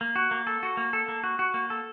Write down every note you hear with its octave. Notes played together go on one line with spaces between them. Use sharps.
A#3
F#4
A#3
A4
F#4
A#3
A4
A#3
F#4
F#4
A#3
A4